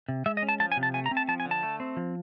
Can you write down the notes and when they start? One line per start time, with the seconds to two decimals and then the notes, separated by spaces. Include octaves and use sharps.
0.08 C3
0.26 G#3 E5
0.37 D#5
0.42 C#4
0.49 A5
0.60 F3 A5
0.72 G#5
0.77 C3
0.83 A5
0.94 A3 G#5
1.06 A#5
1.11 C4
1.17 A5
1.28 F3 A5
1.40 G#5
1.45 D3
1.51 A5
1.63 A3
1.80 C4
1.97 F3